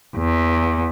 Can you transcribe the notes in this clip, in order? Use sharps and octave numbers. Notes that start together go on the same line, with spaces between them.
E2